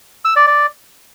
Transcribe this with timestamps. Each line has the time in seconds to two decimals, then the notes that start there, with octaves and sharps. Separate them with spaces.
0.25 E6
0.36 D5
0.47 D5